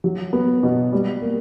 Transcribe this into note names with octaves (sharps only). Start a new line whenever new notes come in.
F#3
B3
B2
G3
A#3